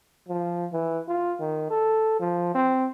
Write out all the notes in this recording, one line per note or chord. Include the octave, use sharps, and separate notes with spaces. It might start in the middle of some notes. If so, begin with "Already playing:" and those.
F3
E3
F4
D#3
A4
F3
C4